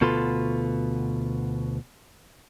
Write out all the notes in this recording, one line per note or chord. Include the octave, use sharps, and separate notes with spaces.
D2 B2 F4 A4 B4 C6